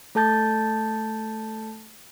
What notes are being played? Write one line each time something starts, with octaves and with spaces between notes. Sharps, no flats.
A3 A4 A5 G6 A6